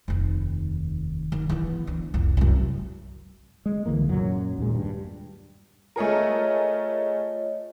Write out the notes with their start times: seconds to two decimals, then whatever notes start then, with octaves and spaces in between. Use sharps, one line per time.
0.08 F1 D#2
1.32 D#3
1.49 E3 B3
1.87 D2
2.14 C2 F2
2.37 C2 F#2
3.66 G#3
3.86 C2 D3 E3 A#3
4.09 F#2 A#2 F#3
4.58 D#2 A#2 G#3
4.75 G2
5.96 A3 F4 G#4 A#4 C#5 D#5